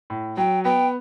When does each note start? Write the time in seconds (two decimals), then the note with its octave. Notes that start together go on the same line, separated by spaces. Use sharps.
0.10 A2
0.37 F#3 G5
0.64 B3 G5